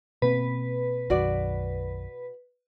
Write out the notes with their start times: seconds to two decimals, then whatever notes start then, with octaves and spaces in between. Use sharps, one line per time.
0.22 B2 A#3 C4 B4
1.10 B1 F#2 D#3 F#4 D5